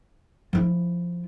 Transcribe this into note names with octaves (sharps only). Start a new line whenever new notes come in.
F3 E4